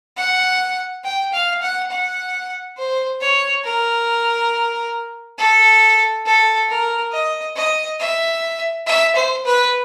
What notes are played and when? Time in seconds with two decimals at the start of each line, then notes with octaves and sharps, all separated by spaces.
0.17 F#5
1.04 G5
1.33 F5
1.62 F#5
1.90 F#5
2.77 C5
3.21 C#5
3.64 A#4
5.38 A4
6.26 A4
6.69 A#4
7.13 D#5
7.56 D#5
8.00 E5
8.86 E5
9.16 C5
9.45 B4